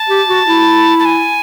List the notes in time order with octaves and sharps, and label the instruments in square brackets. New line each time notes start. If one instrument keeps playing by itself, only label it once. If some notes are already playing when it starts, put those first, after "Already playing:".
Already playing: [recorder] A5
[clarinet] G4
F#4
E4
[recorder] A5
G#5